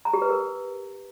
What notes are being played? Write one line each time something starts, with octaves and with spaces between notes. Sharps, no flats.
A#5
G4
B4
A#4